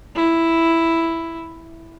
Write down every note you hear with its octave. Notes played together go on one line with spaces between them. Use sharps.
E4